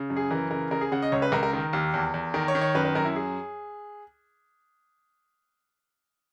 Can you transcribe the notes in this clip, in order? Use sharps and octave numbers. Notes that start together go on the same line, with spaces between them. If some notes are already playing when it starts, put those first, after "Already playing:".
Already playing: C#3
F#2
G#4
E3 A#4
C#3 A#4
C#3 A#4
G#4
C#3 F#5
D#5
C#2 C#5
B4
C#2 A#4
A#4
D#3 A#4
D#2
E2
E2
D#3 A#4
C#5
D#3
C#5
F#2 B4
B4
F#2 A#4
E4
G#4